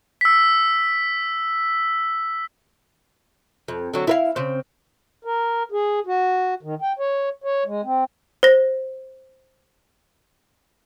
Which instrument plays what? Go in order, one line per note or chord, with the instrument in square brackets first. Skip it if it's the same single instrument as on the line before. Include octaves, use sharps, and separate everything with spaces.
[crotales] E6 B6
[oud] F2
D3 F#3
E4 B4 F5
C#3 C4
[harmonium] A#4
G#4
F#4
D#3
G5
C#5
C#5
G#3
C4
[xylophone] C5 A#6